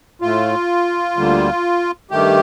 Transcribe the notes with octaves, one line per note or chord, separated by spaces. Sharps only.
A2 A3 F4
D2 D3 G3 A#3
G2 D#3 A3 G4